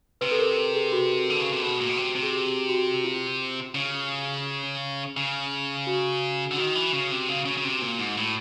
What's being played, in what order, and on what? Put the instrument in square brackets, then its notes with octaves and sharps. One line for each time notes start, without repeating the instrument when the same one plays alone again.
[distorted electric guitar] C3 [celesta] B4
[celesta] A4
A#4
G#4
F#4
[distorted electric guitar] D3
C#3
C3
[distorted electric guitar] B2 [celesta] F#4
[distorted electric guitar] A#2
B2
C3
C3
[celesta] G#4
G4
F#4
F4
[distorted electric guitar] C#3
C#3
[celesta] F#4
[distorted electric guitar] D3
[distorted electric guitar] D#3 [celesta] F#4
[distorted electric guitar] E3
C#3
C3
C#3
C#3
C#3
C3
A#2
G#2
A2